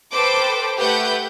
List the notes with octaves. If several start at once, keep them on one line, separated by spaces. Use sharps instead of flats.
A4 B4 C5 G5 D6
A3 G4 B4 F#5 G6